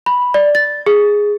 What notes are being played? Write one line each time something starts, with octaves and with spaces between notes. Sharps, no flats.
B5
D5
A6
G#4